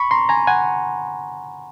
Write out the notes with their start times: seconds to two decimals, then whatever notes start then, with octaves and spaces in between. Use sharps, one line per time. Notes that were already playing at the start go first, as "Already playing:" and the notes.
Already playing: B5 C#6
0.11 A#5 C6
0.29 G#5 A#5
0.47 F#5 G#5